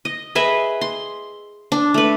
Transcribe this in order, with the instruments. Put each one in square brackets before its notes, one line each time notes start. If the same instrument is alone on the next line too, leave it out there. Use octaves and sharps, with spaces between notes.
[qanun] D#5
G#4 B4 D#5 E5
C6
D4
A3 B4